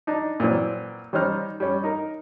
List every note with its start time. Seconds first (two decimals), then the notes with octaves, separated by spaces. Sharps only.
0.07 D4 D#4
0.40 A#2 E3 F#3 C4
1.13 D#3 G3 C#4 D#4 C5 F6
1.60 G3 C#4
1.84 D#4 A#4